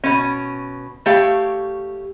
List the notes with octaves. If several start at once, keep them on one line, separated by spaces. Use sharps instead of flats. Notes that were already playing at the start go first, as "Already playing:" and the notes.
B2 C#4
A3 G4 C#5 F5